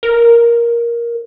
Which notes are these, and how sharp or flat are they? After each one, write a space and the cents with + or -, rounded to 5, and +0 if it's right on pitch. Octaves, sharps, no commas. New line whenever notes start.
A#4 +10